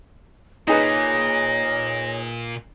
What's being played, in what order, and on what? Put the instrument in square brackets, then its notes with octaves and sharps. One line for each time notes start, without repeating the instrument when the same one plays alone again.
[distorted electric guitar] A#2 [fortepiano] D#4 G#4 B4 [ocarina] C#5 [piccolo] A#6